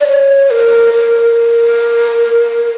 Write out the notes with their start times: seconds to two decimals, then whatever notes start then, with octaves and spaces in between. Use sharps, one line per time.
0.01 D5
0.08 C#5
0.50 A#4
0.94 A#4